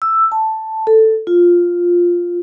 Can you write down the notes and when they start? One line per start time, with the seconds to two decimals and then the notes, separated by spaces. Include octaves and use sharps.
0.02 E6
0.32 A5
0.87 A4
1.27 F4